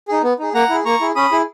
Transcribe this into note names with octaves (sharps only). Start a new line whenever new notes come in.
D#4 G#4
B3
D#4 G#4
A#3 F#5 A#5
E4 G#4
A#3 A#5 C#6
E4 G#4
C#4 B5 D#6
E4 G#4